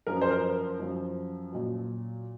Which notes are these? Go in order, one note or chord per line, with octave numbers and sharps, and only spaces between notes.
F#2 F3 A#4
C5
A#4
F#2 F3
A#2 F#3